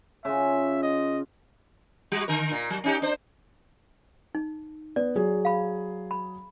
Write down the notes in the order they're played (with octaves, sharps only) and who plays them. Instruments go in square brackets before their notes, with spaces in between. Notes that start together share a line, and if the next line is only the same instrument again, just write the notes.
[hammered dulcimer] C#3 F4 [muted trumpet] E5
[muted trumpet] D#5
[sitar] G3 F#4
D3 A#4
A#2
F#3
C#4 D#4 G4
D4 C5
[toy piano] D#4
[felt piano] B3 [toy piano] D5
[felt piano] F#3 G#4
[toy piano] F5 B5
B5